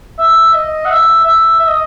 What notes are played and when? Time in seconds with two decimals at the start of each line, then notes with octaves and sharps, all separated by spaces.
0.19 E5
0.53 D#5
0.85 F#5
0.90 E5
1.24 E5
1.60 E5
1.67 D#5